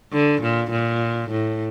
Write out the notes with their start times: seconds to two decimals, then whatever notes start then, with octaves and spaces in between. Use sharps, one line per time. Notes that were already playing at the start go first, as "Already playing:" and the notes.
0.13 D3
0.42 A#2
0.71 A#2
1.31 A2